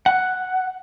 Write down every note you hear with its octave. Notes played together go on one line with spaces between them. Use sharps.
F#5